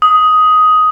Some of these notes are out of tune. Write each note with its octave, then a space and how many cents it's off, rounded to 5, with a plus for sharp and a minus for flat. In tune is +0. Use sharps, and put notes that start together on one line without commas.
D#6 +10